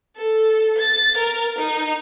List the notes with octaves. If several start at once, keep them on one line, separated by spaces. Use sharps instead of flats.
A4
A6
A#4
D#4